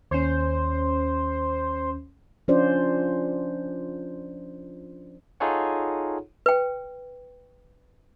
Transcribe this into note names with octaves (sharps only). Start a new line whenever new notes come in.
D#2 C#4 C5
F3 C#4 D4 F4 C5 D5
D#4 F4 G#4 A4 C#5 F#5
B4 G5